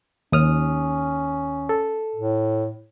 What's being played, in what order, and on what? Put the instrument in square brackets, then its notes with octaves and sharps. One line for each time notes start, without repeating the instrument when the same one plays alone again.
[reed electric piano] D#2 D#6 F6 [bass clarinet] C#4
[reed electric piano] A4
[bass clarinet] A2